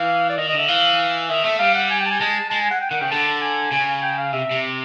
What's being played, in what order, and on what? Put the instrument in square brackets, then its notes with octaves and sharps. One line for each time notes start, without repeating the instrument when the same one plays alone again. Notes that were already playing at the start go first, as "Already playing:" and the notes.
Already playing: [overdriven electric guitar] E3 [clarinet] F5
[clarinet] D5
[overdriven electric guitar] D#3 [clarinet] D#5
[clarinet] D#5
[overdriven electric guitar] D3
[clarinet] E5
[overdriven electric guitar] E3 [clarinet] F5
[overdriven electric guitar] D#3 [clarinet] E5
[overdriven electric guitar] A3 [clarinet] E5
[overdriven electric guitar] G3 [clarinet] F5
[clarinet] F#5
G#5
G5
A5
G#5
[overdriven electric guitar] G#3 [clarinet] A5
[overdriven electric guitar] G#3 [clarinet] A5
[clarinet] G#5
F#5
G5
[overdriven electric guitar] D#3 [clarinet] F#5
[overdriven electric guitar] C#3 [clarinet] G5
[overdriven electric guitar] D3 [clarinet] A5
[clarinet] G#5
[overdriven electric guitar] C#3 [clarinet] G#5
[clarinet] G5
F5
[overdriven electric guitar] C3 [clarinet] E5
[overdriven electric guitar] C3